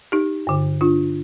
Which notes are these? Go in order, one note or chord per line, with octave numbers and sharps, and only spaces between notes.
D#4 G4
G2 D3
D4 F4